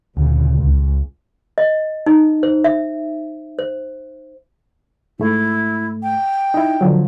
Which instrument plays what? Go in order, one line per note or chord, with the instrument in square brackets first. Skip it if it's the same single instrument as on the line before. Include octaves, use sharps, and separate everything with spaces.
[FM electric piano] D2 [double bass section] A#2 C#3
[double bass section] C#2
[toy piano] D#5
D#4
C5
E5
C5
[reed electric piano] G#2 A3 [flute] E4
[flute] G5
[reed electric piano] D#4 E4
D3 F3 F#3